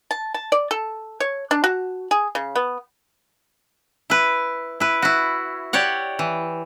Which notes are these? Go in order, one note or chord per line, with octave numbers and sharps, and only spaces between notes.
A5
A5
D5
A4
C#5
D4
F#4
G#4
C#3
B3
E4 B4
E4 B4
E4 F#4
G4 C#5 D5 F#5
E3